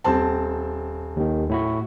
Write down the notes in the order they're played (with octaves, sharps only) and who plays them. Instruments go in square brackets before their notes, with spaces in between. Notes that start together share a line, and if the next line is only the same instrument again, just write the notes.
[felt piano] D#1 C4 A5
[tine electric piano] D#2 D#3
A2 E4 F#4